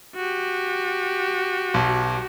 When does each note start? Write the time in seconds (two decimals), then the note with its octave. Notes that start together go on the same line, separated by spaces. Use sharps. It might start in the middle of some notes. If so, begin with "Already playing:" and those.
0.15 F#4 G4
1.74 B1